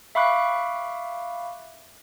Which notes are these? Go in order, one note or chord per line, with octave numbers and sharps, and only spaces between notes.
E5 F5 B5 C#6 D6 F#6